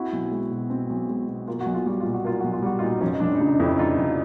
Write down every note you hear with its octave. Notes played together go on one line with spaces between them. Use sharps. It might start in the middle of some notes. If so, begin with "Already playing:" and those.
Already playing: C4 E4 F#4
B1
G#3
B2
C4
B1
G#3
B2
A#3 F4
F#4
B1
F4
G3 F#4
A#2 F4
F#4
A#3 F4
B1 F#4
F4
G3 F#4
D#4 F4
A#2
F1 C#4 D#4
F1 D4
D#4
C#3 D4
F2 D4 E4
F1 D#4 F4
F1